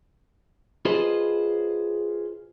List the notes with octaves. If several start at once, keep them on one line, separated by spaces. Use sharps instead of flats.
F4 G#4 B4 C5 D#5